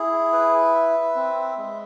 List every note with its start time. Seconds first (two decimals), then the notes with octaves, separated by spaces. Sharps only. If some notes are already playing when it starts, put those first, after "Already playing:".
Already playing: E4 G#4
0.33 B4
0.75 E5
1.16 C4
1.58 G#3